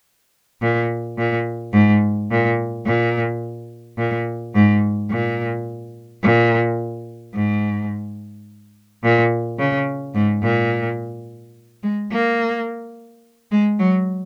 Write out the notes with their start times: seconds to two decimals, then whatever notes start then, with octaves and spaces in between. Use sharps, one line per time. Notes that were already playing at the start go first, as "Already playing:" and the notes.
0.61 A#2
1.18 A#2
1.73 G#2
2.30 A#2
2.86 A#2
3.98 A#2
4.55 G#2
5.10 A#2
6.23 A#2
7.34 G#2
9.03 A#2
9.58 C#3
10.14 G#2
10.42 A#2
11.83 G#3
12.12 A#3
13.51 G#3
13.79 F#3